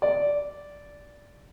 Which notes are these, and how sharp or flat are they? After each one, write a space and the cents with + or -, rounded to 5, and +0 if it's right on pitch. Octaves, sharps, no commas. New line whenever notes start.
D5 -10